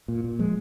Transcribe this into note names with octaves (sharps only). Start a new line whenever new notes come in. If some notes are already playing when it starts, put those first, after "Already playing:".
A#2
A#2
F3 G#3